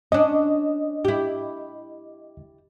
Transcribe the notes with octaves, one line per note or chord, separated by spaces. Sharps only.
C#4 D4 D#5
E4 G4